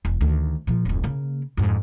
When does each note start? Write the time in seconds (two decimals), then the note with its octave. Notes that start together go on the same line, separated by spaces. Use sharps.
0.05 E1
0.21 D2 D#3
0.67 A#2 F3
0.85 D1 F2
1.04 C#3 A#3
1.57 F2 G#2